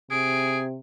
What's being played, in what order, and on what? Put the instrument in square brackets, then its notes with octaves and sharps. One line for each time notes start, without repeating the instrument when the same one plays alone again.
[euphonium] C3 [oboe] G#4 [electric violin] D7